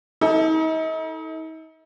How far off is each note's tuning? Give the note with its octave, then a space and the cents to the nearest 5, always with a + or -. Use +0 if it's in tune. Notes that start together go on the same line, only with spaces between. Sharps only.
D#4 +40 A4 +0